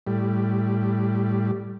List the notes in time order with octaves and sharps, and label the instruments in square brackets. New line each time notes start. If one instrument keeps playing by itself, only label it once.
[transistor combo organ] A2 G3